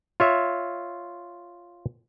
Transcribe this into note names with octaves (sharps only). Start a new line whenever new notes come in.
F4 C#5 E5